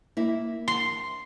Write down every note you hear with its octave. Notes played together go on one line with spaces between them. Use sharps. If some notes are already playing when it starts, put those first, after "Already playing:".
A#3 E4
C6